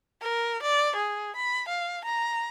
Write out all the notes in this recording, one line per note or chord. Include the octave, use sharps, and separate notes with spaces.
A#4
D5
G#4
B5
F5
A#5